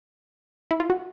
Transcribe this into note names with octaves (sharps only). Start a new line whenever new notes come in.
E4
F4
F#4